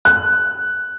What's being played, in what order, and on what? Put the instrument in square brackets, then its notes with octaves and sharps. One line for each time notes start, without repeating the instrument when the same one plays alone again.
[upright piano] F#6